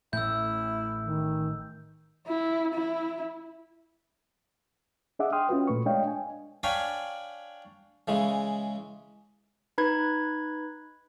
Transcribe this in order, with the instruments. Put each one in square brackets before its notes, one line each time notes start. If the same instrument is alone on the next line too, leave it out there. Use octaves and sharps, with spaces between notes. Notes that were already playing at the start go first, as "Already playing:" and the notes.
[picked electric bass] A1 A2 A3 [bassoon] E4 [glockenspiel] E6 G6
[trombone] D#3
[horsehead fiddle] E4
E4
[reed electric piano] D4 G#4 D#5 E5 F#5 D6
G5 C6 D#6 F6
C#4 F4 F#4 B4
A#2 A3 B4 C#6
G#3 D4 C#5 D#5 F5 G5
G#5
[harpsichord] D4 C#5 F5 G5 G#5 B5
C#3 E3 G#3
[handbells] D#4 B4 B5 G#6